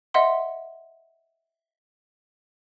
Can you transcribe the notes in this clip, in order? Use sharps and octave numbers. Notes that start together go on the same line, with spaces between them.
D#5 E5 F#5 C6